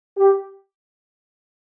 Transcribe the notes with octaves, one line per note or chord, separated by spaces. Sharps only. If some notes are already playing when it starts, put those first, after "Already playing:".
G4